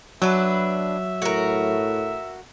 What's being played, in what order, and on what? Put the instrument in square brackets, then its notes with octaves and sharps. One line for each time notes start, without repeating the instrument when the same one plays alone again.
[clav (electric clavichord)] F#3 [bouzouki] D4 B4 [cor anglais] E5
[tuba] A2 [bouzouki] F#4 A#4